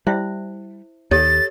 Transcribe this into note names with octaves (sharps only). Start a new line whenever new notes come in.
G3 E4 C5 E5
D#2 G4 A4 C#5 A6